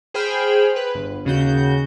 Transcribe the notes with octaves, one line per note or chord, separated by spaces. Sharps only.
G#4 C5 G5 B5 F6
B4
G1
D#2 C#3 F#4 G6